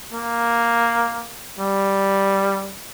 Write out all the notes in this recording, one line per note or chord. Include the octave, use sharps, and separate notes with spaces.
A#3
G3